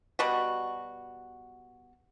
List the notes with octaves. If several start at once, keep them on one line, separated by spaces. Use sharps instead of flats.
B2 G3 F#4